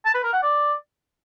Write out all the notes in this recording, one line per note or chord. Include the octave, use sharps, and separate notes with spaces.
A5
B4
A#4
F#5
D5